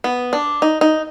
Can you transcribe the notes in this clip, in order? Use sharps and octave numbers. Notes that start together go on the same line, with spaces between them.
B3
D4
D#4
D#4